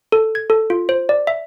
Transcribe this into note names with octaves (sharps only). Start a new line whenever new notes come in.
A4
G#6
A4
F4
C5
D5
E5